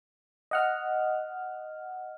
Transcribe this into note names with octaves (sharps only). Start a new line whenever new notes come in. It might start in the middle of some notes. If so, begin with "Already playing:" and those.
D#5 F#5 F6